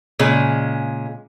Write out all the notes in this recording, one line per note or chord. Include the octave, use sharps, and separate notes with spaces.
A#2 C#3 G#3